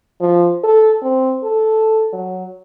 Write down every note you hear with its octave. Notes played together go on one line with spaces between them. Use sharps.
F3
A4
C4
A4
F#3